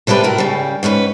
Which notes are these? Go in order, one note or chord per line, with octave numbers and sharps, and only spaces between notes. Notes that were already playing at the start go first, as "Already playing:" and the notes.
C3 G3 D4 G4 B4
A2 F#4 A#4
C#3 G3
G#2 C#4 A4 B4